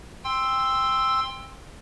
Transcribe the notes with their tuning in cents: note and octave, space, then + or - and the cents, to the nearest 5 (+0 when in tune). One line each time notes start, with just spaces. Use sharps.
G5 +20 C6 +0 E6 +0